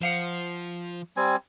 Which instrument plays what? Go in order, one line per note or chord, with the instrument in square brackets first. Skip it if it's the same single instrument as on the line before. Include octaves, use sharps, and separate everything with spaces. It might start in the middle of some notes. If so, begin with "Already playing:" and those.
[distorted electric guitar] F3 [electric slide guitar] C5 F5 F#5
[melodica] G3 C4 G#5